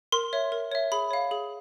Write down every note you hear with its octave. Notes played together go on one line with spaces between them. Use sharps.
A#4 C6
C#5 E5
A#4
C#5 E5
G#4 B5
C#5 F5
G#4